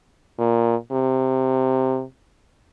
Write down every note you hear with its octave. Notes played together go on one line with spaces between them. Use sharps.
A#2
C3